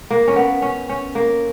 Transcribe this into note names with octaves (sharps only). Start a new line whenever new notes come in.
A#3
C#4
B3
C#4
C#4
A#3